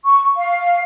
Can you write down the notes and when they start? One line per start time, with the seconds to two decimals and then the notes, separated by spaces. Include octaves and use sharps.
0.05 C#6
0.37 F5